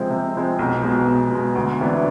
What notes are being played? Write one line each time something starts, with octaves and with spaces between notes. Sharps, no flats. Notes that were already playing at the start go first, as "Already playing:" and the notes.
Already playing: C3 F3 G#3 C4
C3
F3 G#3 C4
B1
B2 G#3
B1
B2 G#3
D2
C3 E3 B3 D4